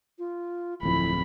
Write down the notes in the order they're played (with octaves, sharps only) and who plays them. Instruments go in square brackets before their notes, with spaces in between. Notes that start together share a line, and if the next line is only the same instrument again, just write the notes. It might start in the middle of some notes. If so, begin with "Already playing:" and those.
[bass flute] F4
[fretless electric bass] D1 F2 [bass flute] E4 [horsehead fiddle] B5